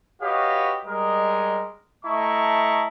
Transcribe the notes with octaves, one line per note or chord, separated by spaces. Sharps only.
F#4 G4 B4 C#5 D#5 F5
G3 G#3 A#4 D#5
A3 E4 D#5 A5 A#5 C#6